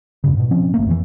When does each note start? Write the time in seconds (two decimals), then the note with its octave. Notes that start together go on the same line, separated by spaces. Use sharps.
0.24 E2 G2 C#3
0.37 G#2 B2
0.51 F3 C4 C#4
0.74 G#1 A3 A#3
0.87 F2 C3 E3